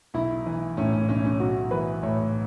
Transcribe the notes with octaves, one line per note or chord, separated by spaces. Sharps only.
B1 E4
E3
A2 C#4
C#4
B1 C#4
C#4
B1 F#4
E3 B4
A2 C#5